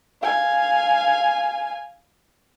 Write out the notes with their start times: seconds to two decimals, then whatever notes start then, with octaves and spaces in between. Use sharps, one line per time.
0.23 F5 G#5